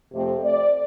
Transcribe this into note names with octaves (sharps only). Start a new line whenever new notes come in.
F2 C3 A3 C4
D5